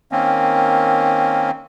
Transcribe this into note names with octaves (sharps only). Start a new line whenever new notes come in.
D#3 A#3 C4 C#4